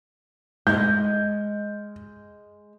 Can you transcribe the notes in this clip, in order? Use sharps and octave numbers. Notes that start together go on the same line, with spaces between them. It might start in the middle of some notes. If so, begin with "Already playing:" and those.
G#3 D#5 G6